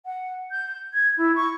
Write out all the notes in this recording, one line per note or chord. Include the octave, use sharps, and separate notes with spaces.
F#5
G6
G#6
E4
C#6